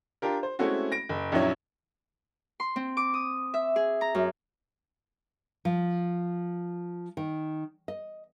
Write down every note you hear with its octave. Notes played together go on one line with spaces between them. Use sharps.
D4 F4 G4 A#4
C5
G#3 A3 C4 C#4 E4 F#4
A#6 D7
F#1
A#1 F#2 F#3 D#4 E4 C#5
C6
C4
D6
D#6
E5
G#4
A#5
F#2
F3
D#3
D#5